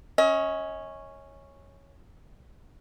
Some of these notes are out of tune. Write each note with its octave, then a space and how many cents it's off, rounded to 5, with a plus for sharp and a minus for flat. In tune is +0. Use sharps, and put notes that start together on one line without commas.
C#4 -5 D#5 +35